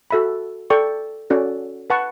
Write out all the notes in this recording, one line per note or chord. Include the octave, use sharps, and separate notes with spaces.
F#4 A4 E5 B5
A4 D5 G5 C#6
C#4 F#4 A4 D5
B4 F#5 A5 C#6